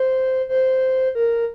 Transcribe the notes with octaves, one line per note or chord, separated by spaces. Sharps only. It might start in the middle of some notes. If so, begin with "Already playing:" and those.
Already playing: C5
C5
A#4